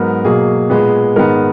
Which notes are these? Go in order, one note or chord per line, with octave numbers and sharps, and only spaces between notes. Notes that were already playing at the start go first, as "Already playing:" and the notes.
Already playing: G#2 F#3 B3 A#4
B2 F#3 A#3 G#4
A#2 G#3 B3
G#2 D#3 G#3 B3 A#4